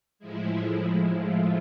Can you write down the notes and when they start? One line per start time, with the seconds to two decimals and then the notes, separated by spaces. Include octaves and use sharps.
0.19 A2 F3 G#3 E4
0.81 E4
1.13 F4